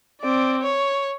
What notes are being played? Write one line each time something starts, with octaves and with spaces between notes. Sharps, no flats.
C4 D5
C#5